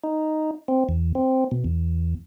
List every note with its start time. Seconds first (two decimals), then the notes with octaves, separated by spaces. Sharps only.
0.04 D#4
0.68 C4
0.89 E2
1.15 C4
1.51 B2
1.64 E2